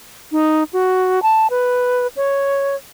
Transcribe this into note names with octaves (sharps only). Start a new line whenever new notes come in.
D#4
F#4
A5
B4
C#5